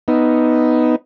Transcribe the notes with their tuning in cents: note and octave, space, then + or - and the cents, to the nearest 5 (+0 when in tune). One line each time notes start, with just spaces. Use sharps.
B3 +0 D#4 +5